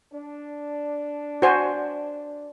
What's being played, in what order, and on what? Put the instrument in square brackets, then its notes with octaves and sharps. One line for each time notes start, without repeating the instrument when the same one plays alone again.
[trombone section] D4
[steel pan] F#4 C5 G#5